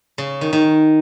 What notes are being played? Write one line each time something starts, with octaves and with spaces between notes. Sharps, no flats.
C#3
D#3
D#3